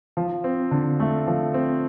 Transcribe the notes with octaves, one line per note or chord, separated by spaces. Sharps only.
F3
C4
D3
A3
F3
C4